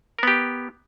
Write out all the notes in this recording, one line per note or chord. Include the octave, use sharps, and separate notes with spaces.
B3 G4 A#4